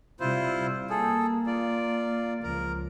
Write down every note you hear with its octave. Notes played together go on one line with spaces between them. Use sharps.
C3 G3 E4 F4 C5
A#3 G#4 A4
F4 D5
C#2 F3 A#4